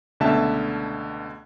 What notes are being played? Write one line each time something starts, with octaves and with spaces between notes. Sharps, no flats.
C#2 B2 D3 A3 E5 A5